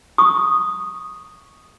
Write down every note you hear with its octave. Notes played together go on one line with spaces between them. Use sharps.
C#6 D#6